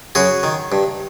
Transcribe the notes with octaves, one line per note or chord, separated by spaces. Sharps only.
F#2 F#4 G#4
D#3
G2